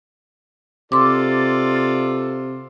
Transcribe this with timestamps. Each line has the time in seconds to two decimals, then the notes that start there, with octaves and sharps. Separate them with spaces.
0.92 C3 F4 A4 D5 C6 D6